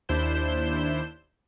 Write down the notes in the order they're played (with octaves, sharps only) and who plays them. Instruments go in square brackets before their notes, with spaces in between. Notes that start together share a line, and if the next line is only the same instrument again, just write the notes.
[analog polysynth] D#2 D4 E4 C5 G6 E7